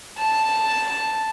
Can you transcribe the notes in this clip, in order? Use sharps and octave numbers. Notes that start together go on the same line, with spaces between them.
A5